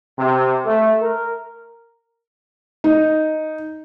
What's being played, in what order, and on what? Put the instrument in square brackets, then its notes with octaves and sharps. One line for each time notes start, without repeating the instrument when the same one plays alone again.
[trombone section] C3
A3
A#4
[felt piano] D#4